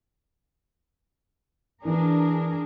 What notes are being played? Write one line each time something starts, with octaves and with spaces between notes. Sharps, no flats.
E3 D4 G#4 A#4